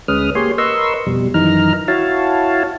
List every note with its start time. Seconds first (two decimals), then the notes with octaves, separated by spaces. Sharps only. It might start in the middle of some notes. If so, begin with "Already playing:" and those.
0.08 D2 G#3 C#4 B4 D#6 F6
0.35 A#3 G4 G#4 C#5 C6
0.58 A#4 B4 D#5 C6 C#6 E6
1.06 F2 B2 G3
1.34 F#2 D#3 E3 D#4 A#5 F6
1.88 E4 F#4 C#5 F5 A5